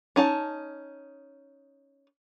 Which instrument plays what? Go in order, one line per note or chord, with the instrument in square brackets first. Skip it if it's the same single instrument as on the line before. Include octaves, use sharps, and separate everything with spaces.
[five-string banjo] C#4 D#4 A5